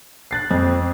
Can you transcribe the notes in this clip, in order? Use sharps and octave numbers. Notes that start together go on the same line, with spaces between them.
F#6 A6 C7
F2 C4